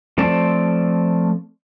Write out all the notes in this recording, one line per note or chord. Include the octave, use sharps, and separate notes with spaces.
F3 A3 C4 D5 A5